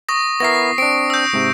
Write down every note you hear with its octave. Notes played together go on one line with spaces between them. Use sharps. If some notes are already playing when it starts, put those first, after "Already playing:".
C#6 D#6 A#6
B3 E4 A#4 A#6 C7
C4 D4 D7
E6 G6
G#2 C3